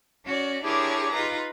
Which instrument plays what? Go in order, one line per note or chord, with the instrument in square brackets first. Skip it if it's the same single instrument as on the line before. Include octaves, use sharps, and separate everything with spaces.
[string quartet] C#4 F#4 D5
D4 E4 G4 G#4 A#4 C#5
D#4 F4 B4 A#5